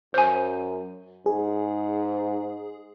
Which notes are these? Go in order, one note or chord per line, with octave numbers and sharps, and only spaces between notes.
F#2 C5 G#5
G#2 G#4